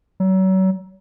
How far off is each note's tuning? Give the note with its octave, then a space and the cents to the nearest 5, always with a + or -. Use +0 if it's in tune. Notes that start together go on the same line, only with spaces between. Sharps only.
F#3 +35